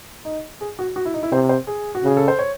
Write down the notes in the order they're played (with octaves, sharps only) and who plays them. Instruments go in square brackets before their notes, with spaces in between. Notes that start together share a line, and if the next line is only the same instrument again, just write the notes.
[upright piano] D#4
G#4
F#4
F#4
E4
D#4
E4
[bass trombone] C3 [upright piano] C5
[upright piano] C5
G#4
F#4
[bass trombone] C#3 [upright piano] G#4
[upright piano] A4
C5
C#5